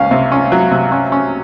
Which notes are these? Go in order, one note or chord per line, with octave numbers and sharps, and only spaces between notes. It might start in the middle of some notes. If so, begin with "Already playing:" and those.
Already playing: C#2 C#4 F5
C3
C#4
F#3
C3
C#4
C#4